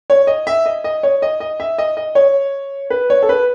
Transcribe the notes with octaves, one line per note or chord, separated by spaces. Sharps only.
C#5
D#5
E5
D#5
D#5
C#5
D#5
D#5
E5
D#5
D#5
C#5
B4
C#5
A4
B4